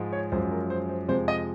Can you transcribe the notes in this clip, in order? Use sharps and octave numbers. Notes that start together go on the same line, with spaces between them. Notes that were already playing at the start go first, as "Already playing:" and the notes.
Already playing: G#2 F3 G#3
C#5
F#2 F3 G#3 C5
A#4
C5
C5
F2 C3 F3 G#3 C5
D#5